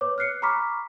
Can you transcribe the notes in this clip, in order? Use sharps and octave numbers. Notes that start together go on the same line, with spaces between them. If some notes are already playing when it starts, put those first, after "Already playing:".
B4 C#5 D6
F6 F#6 C7 C#7
A#5 B5 C#6 D6 F6 B6